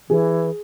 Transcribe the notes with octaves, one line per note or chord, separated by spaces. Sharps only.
E3 G#4